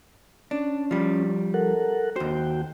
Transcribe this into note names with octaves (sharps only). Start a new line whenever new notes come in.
C#4 D4
F3 G3
A4 A#4 F#5
D#2 F#4 C5 G5